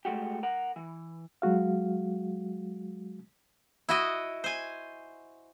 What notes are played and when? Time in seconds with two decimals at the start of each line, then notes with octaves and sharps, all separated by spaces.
0.05 G#3 A3 F#4 G4
0.43 A#4 F#5
0.76 E3
1.42 F#3 G#3 F#4 F5
3.89 E4 F#4 D#5
4.44 C5 G#5